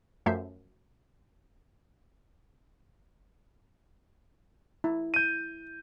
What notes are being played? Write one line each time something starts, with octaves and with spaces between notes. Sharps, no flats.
F#2 F3 A3 E5 G6 C7
E4
G6 D#7